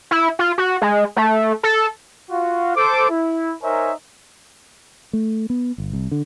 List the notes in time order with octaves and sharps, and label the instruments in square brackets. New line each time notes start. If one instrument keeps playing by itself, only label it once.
[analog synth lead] E4
F4
F#4
G#3
A3
A4
[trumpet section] F4 F#4 F5
A4 C5 D6
E4
D#4 A#4 C5 C#5 E5 G#5
[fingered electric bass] A3
B3
G1
C2
D3